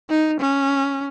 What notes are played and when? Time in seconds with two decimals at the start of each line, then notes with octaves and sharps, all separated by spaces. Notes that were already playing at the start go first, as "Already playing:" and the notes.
0.10 D#4
0.40 C#4